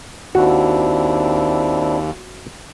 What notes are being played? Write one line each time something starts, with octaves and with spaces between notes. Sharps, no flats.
D#2 C4 D4 E4 F#4